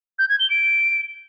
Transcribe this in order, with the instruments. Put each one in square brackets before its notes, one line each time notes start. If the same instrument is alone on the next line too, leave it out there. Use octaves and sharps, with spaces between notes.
[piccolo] G6
G#6
G7
D7